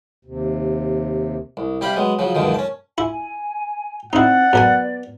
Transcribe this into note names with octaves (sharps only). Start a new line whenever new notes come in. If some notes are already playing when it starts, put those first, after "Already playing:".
D#2 C3
C2
C3 G3 G4 F5 B5
F#3 G#3 B3
C#3 F3 F#3
C#2 F#2 B2 D3 D#3 F3
C#4 A5
E4 G#5
C4 D#4 E4 D5 F#5
F#2 B3 A#4 G#5